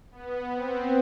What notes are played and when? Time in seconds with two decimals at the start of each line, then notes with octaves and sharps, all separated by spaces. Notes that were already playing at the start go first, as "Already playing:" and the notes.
0.11 B3
0.52 C4